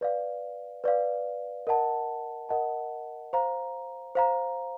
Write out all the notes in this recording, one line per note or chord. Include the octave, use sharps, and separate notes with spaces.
B4 D5 F5
B4 D5 F5
A#4 D#5 F#5 A5
A#4 D#5 F#5 A5
C5 F5 A#5
C5 F5 A#5